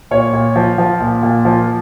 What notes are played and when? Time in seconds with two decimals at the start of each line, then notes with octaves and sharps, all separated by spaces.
0.11 A#2 C#5
0.33 A#2
0.56 F3
0.78 F3
1.00 A#2
1.23 A#2
1.45 F3